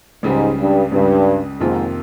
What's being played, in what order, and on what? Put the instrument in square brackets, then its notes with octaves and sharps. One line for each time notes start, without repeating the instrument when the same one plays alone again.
[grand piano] C#2 C#3 G3 [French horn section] G#2
[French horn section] G2
[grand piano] C#2 C#3 G3 [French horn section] G2
[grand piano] F2 C3 D#3 A#3 F4 [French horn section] G#2